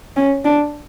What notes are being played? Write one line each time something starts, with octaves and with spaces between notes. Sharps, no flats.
C#4
D4